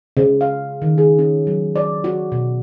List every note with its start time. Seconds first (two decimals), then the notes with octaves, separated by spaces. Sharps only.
0.17 C#3
0.41 F5
0.82 D#3
0.98 G#4
1.19 C#4
1.47 F#3
1.76 D5
2.04 F#4
2.32 B2